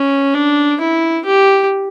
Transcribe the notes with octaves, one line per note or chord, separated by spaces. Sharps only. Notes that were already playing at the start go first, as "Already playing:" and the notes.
Already playing: C#4
D4
E4
G4